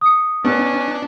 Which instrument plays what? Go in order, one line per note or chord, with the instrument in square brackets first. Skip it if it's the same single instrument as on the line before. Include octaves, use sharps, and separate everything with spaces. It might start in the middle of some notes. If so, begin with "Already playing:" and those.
[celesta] D#6 C#7
[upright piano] B3 [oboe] C#4 [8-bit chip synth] D4